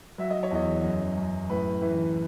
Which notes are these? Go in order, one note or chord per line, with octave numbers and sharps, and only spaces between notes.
F#3 E5
D#5
C#5
E2 D#5
F#2
F#2
A2 B4
E3